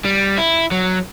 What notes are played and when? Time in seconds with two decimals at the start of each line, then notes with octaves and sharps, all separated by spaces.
0.05 G3
0.38 E4
0.71 F#3